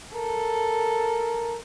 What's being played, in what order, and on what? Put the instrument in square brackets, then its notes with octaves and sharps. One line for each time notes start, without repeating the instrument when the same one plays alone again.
[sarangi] A4 [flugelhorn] A#4